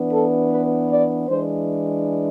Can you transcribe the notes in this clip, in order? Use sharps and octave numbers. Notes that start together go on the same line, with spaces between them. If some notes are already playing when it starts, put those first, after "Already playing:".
Already playing: E3 B3 D4
A4
B4
D5
E3 G#3 D4 C5